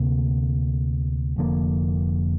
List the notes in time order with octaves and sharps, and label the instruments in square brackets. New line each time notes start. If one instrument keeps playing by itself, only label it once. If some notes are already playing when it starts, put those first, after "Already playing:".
Already playing: [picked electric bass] D2 C3 A#3
F1 F2 D3 A#3